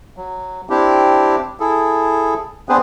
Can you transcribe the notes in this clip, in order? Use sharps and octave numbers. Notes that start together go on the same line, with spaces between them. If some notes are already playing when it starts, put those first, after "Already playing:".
F#3
C4 D4 E4 G4
E4 G#4 A4
B3 C4 D4 G#4 B4 C5